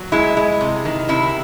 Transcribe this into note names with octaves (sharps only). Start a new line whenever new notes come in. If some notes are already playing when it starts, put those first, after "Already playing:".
Already playing: F#3
G#3 E4
G#3
C3
D#3
C3 E4